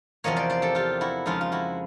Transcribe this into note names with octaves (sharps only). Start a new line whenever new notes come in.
E2 C3 F3 A#3 C#5 D#5
C5 D5
C5 D5
G4 A4
F4 G4
E4 F#4
F2 C#3 F3 G#3 D#4 F4
F4
E4 F#4